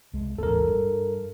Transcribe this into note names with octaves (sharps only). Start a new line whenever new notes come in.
C2 G#3
D#1 A1 G#2 A4 A#4
G2